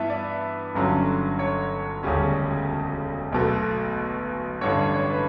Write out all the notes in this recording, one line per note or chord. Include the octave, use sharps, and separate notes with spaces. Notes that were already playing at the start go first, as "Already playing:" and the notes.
Already playing: G2 E3 B3 E5 A5
D5
G1 G2 D3 F#3 C#4
C#5
E1 D2 C#3 G3 C#4
B1 B2 A3
A1 G2 D3 C#5
D5
C#5
B4